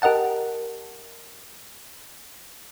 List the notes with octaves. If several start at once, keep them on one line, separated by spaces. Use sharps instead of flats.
G4 A#4 D#5 F#5 A5